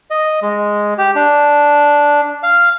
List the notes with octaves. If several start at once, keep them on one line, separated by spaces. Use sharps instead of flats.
D#5
G#3
G4
D4
F5